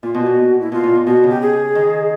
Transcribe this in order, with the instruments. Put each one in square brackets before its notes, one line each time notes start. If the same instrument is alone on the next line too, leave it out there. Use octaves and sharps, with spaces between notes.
[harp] A#2 [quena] F4
[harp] B2
[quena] F#4
[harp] A#2
[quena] E4
[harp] B2 [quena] F4
[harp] A#2
A#2
[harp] B2 [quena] F#4
[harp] C#3
[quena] G4
G#4
[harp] D#3